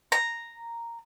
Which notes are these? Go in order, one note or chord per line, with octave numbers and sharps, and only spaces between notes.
A#5